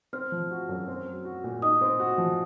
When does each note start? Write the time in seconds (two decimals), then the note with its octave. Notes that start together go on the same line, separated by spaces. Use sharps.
0.13 C4 F6
0.32 F3
0.51 F#4
0.69 F#2
0.88 C4
1.06 F#3
1.25 F#4
1.44 A#2
1.62 D#4 D#6
1.81 C4
2.00 F#4
2.18 F3